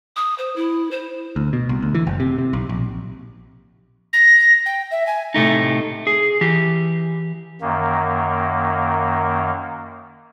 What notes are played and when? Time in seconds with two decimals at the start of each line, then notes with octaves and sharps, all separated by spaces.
0.16 D#6
0.38 C5
0.56 E4
0.91 C5
1.36 D2
1.53 B2
1.69 C2
1.82 D2
1.95 E3
2.07 F#1
2.20 C3
2.38 C3
2.53 B1
2.69 A#1
4.13 A#6
4.66 G5
4.91 E5
5.07 G#5
5.34 A2 C3 A3 D#4
6.07 G#4
6.41 E3 G4
7.61 F#2 D#3 A#3